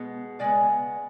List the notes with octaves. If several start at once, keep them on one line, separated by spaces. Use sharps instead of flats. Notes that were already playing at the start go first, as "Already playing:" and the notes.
Already playing: B2 G#3 B3
C#3 G#3 B3 D5